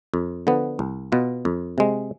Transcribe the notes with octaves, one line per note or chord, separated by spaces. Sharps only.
F2
D3 F3 B3
C2
B2 B3 F4
F2
C3 G#3